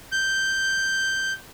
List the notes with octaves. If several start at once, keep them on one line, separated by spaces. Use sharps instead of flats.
G6